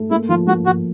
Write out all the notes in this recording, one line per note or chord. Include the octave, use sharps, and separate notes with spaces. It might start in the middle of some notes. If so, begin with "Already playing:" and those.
Already playing: A3
A#3 E4
F3 F4
A#3 F#4
F3 F#4